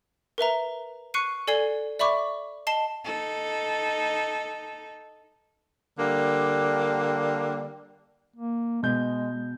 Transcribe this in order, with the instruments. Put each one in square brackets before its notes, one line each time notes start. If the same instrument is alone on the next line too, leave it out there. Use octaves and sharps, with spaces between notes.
[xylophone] A#4 B4 E5 A#5
C#6 F#6 C7 C#7 D#7
A4 D5 G#5 G#6 C7 G7
D5 E5 B5 C#6 D6
D#5 A5 C7 E7 G7
[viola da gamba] D#4 A4
[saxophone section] D3 G3 A#3
[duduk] A#3
[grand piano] B2 G6 [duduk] G#3